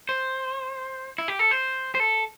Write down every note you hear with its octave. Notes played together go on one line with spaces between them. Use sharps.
C5
E4
G4
A4
C5
C5
A4